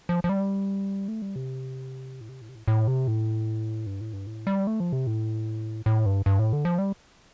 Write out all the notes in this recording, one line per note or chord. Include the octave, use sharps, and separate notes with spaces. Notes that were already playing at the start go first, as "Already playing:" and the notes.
F3
F3
G3
A3
G3
C3
A2
C3
A2
C3
A2
A2
C3
A2
G2
A2
G2
A2
G3
A3
F3
C3
A2
A2
G2
G2
A2
D3
F3
G3